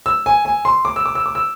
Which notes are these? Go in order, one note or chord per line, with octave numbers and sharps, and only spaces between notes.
E6
G#5
G#5
C6
D6
E6
D6
E6
D6
E6